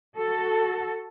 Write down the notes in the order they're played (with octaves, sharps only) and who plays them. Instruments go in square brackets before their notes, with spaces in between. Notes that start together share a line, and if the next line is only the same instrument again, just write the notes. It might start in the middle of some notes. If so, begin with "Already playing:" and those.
[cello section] F#4 A4